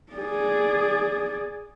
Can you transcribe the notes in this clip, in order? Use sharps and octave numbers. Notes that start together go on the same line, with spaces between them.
G#4 D5